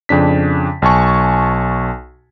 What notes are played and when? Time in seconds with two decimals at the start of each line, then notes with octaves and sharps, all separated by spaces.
0.09 F2 C#3 D4 B6
0.82 B1 G#5 A5 C#6